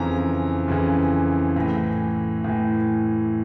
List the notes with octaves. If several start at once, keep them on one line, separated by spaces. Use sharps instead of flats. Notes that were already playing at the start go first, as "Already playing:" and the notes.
Already playing: F2 C#3 E3 A#5
F2 C#3 E3
A2 E3
A2 E3